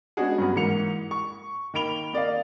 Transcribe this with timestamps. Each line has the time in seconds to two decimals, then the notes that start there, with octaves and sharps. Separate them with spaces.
0.17 G#3 B3 C#4 D4 F#4 G#4
0.38 G2 F#3 B3
0.56 G#2 E3 A#3 C#7 F7
1.11 C#6
1.74 D#3 A#3 B5 D7 F7 G7
2.13 A#3 D5 D#5 F5